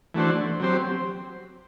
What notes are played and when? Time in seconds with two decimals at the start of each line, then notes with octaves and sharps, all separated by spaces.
0.14 E3 A3 D4 F#4 C5
0.60 F#3 C4 G4 C5